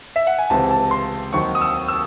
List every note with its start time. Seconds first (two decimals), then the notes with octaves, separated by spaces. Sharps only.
0.16 E5
0.27 F#5
0.39 G#5
0.50 C#2 C3 E3 C4 A5
0.71 A5
0.91 C6
1.33 D#2 D#3 F#3 C4 D#4 C#6
1.55 D#6
1.61 E6
1.88 E6